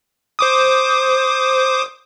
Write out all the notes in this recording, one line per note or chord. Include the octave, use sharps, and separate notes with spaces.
C5 D6 D#6